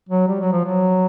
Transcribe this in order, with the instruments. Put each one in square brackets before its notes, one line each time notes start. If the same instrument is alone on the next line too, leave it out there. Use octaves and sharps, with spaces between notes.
[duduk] F#3
G3
F#3
F3
F#3